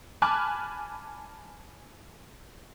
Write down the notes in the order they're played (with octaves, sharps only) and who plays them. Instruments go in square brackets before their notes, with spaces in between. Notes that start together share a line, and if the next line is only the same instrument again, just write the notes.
[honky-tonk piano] G#5 A5 B5 D6 F6 F#6